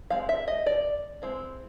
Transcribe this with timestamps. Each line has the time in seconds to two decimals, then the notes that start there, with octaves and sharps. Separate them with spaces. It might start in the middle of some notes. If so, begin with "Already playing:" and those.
0.10 G#3 C4 F5
0.29 E5
0.48 D#5
0.66 D5
1.22 G#3 C4 E4